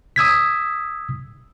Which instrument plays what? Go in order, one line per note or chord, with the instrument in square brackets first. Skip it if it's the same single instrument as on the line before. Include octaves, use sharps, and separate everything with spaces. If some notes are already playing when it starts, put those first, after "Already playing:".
[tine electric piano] D#6 E6 G#6 B6